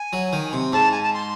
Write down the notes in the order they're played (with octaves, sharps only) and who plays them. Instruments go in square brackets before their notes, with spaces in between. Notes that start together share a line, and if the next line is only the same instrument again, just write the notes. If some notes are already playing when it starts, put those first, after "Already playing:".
Already playing: [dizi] G#5
[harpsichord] F#3
D#3
C3
[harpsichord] G#2 [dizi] A5
[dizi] G#5
A5
C6